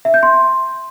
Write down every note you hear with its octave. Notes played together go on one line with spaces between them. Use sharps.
E5
G6
C6